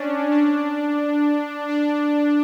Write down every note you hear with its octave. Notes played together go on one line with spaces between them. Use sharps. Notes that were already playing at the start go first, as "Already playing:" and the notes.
Already playing: C#4 D4
D4
D4